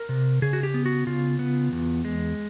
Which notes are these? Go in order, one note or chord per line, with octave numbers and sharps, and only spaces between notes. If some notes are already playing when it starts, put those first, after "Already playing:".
Already playing: A#4
C3
C#3 G#4
F#4
G4
B3
F#4
C#3 F4
B3
E2
G#3